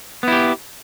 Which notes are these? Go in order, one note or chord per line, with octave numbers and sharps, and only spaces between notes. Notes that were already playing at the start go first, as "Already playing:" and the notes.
B3 E4 G4